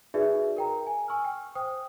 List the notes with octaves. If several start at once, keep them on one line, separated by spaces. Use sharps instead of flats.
D#4 F#4 G#4 B4 D5 E5
A#4 G5 A#5
G#5
G#5 C#6 E6 F6
G5
C5 G5 D#6